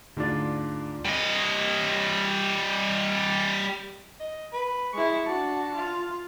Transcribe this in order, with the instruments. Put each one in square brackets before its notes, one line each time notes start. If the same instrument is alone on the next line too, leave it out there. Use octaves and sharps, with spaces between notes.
[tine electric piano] D2 D5 [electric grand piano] G#2 D4 F4
[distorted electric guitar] G3 D#5
[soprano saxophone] D#5
B4
[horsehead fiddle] G#3 E4 [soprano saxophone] C#6
[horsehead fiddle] D4 F#4 [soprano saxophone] A5
[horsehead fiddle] F4